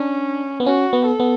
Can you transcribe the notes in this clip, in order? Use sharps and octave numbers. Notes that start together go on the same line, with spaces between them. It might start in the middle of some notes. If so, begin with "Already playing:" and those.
Already playing: C#4 D4
B3
C#4 F#4
B3
A4
B3